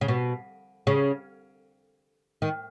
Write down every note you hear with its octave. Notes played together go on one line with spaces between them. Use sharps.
C#3
B2
C#3
D#3